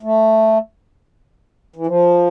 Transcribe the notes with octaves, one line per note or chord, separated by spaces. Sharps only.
A3
E3
F3